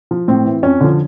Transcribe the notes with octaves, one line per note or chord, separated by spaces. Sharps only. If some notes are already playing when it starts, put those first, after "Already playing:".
F3
A2 C4
E3
F2 C#4
D3 F3